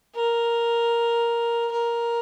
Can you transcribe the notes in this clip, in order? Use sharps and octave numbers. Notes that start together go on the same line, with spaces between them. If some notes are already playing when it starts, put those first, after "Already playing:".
A#4
A#4